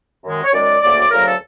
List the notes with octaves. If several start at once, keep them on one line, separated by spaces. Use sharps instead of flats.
F#2 D#3 G#3
C#5
F#2 D#3 G#3 D5
D2 C#3 F#3 A#3 D5
D2 C#3 F#3 A#3 A#4
A4